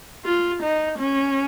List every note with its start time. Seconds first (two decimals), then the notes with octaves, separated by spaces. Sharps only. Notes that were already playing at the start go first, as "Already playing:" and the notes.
0.25 F4
0.62 D#4
0.99 C#4